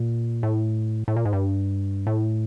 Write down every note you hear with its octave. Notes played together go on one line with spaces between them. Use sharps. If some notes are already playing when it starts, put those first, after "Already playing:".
Already playing: A#2
A2
A2
A#2
G#2
G2
A2